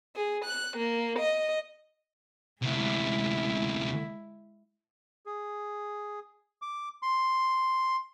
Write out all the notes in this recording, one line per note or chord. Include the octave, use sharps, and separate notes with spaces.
G#4
F#6
A#3
D#5
D2 C3 G#3 E4
G#4
D6
C6